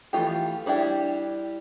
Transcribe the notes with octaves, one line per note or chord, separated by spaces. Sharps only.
E3 G3 A3 F4 G4
G3 D4 E4 G4